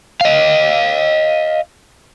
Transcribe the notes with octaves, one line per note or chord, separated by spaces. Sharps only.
D#5 F5